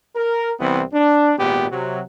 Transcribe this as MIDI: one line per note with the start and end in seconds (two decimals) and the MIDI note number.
0.16 0.51 70
0.60 0.82 36
0.60 0.82 52
0.60 0.82 59
0.60 0.82 60
0.93 1.33 62
1.38 1.66 32
1.38 1.66 46
1.38 1.66 59
1.38 1.66 67
1.70 2.01 48
1.70 2.01 54